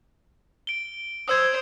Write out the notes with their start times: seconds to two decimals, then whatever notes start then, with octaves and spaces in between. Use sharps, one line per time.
0.67 D7 G7
1.28 C5 D#6 E6 G#6